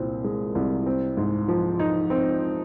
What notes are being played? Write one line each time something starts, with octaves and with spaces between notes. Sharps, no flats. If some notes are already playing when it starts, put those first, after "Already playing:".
Already playing: C2 A#2 C4
G#3
C2
C4
G#2
F3
D#4
C4